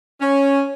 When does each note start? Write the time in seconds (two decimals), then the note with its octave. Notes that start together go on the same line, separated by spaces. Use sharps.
0.21 C#4